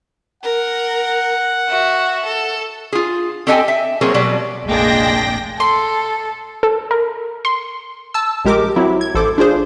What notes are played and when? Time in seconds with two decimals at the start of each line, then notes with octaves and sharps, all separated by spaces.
0.43 A#4 F#5
1.69 F#4 E5
2.26 A4
2.93 F4 G#4
3.47 C4 G4 A4 D#5 G5 G#5
3.68 E5
4.01 F#3 A#3 C4 G#4 A#4 C#5
4.14 B2 F#3 G3 D5
4.66 F1 A#1 G#3 A#3 D4 G#4 G5 A#6
5.60 A4 C6
6.63 A4
6.91 A#4
7.45 C6
8.14 A5 E6
8.45 A#1 G#3 G4 A#4 D6
8.76 F#3 C4 E4
9.01 G#6
9.15 A1 A4 C5 D6
9.38 D4 F4 G#4 C5